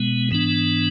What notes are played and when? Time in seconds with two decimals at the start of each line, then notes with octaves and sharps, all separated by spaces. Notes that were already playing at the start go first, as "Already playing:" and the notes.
Already playing: B2 G#3 B3
0.31 G#2 E3 B3 D4